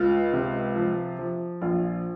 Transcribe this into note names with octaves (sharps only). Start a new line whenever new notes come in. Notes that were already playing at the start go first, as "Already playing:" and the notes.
Already playing: C#2 F4
C3
F3
F3
A#1 F4